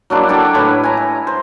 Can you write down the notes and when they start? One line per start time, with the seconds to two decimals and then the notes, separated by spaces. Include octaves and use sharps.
0.10 F#3 A#3 D4 E4
0.29 D4 A4 F#5 G5
0.55 A2 E4 B4 C#5
0.83 G#5 A#5
0.97 E5
1.27 C5